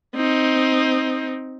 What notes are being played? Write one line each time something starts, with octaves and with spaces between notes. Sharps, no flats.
C4 D#4